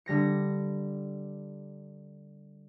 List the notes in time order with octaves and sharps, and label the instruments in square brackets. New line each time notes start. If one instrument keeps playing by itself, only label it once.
[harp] D3 G3 A#6 C#7